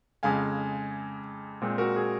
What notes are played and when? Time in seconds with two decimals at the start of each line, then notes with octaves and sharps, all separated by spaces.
0.23 F2 C#3 G#3 F5 G#5
1.62 A#2 G#3 C4
1.78 F#4 A#4
1.96 G#4